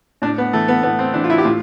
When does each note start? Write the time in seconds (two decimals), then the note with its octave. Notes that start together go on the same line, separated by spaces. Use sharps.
0.22 A2 D4
0.38 B3
0.53 E3 A3
0.68 B3
0.83 A2 B3
0.99 C4
1.14 E3 D4
1.24 F4
1.30 E4
1.38 G4
1.45 A2 F4